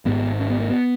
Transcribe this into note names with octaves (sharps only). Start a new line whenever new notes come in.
G#1 G#2 B3
C#4
B3
A#3
B3